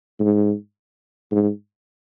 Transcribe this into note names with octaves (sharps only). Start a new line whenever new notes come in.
G#2
G#2